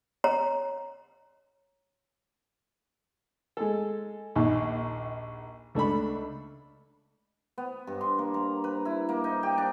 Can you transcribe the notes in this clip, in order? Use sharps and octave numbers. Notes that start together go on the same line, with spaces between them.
C#5 A#5
G#3 A4
A#1 D#2 A#2 D#3
C#2 A3 D4 B5
B3
G2
C6
A#3
A#5
B4
E4
A#3
D#4
G4
D4